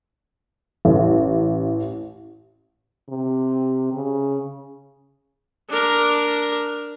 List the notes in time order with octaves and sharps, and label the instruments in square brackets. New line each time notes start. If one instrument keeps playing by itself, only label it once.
[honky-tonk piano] A1
[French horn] C3
C#3
[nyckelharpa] D4 A#4